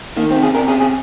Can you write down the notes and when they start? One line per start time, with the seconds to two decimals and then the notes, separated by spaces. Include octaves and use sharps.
0.17 D#3 A#3
0.31 C4
0.36 C3
0.43 G#4
0.55 C3 A#4
0.68 G#4
0.74 C3
0.80 G#4